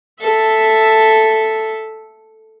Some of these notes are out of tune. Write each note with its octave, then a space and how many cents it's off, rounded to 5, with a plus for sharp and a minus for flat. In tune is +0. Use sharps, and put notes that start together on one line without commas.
A4 +0 E5 +0